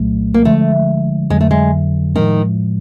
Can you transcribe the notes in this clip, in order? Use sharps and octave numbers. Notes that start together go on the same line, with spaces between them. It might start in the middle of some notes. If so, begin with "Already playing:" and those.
Already playing: C2 A#2 F#3 A3
A#3
D3 F3 G#3 A3
F2 D3 F#3 G#3
A3
G#3
A2 D#3 F3 G#3